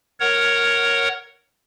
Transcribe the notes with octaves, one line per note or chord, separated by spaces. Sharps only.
A#4 C#5 F#5